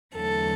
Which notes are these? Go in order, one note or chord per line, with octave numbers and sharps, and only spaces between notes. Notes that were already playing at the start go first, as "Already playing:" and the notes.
E2 D3 F#3 A3 A4